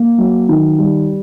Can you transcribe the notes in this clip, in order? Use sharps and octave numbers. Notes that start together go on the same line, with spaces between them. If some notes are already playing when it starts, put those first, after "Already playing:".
Already playing: A#3
F#3
D#3
G3